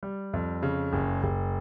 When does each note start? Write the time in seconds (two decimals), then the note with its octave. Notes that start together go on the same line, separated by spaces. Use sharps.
0.03 G3
0.33 F2
0.63 C#3
0.93 F#1
1.23 F#1